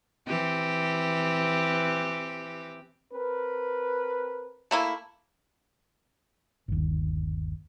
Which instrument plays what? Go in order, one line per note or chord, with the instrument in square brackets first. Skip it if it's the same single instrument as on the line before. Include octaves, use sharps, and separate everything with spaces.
[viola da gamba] E3 C4 G4
[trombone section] C4 A#4 B4
[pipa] A3 A#3 E4
[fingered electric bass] G1 D#2